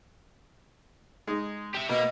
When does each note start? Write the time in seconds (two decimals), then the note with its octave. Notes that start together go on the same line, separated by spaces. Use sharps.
1.27 G#3 D#4
1.75 G4 E5
1.89 B2 A#3 B3 D#5